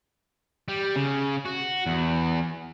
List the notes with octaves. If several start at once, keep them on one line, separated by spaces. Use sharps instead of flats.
G3
C#3
F#4
E2